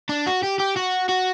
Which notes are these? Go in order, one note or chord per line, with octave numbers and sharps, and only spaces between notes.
D4
F#4
G4
G4
F#4
F#4